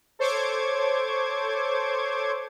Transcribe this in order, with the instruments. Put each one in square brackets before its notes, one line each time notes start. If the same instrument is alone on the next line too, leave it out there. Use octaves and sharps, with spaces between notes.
[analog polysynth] A4 C5 C#5 C#6 D6 G#6